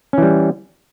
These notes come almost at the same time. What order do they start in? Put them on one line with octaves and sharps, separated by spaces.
C#4 E3 G3